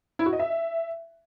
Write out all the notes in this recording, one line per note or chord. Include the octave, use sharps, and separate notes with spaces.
E4
F#4
D#5
E5